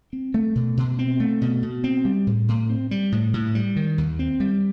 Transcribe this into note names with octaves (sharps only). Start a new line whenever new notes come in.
C4
A3
B2
B2
C4
A3
B2
B2
C4
G3
A2
A2
C4
G3
A2
A2
G3
D#3
D#2
C4
G3